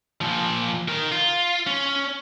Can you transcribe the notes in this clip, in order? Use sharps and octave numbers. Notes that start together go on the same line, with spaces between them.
A#2 F3
D#3 A#4
F4
C#4